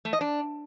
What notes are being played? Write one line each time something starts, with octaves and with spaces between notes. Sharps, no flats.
A3
D#5
D4